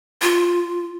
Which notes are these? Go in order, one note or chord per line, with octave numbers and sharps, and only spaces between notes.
F4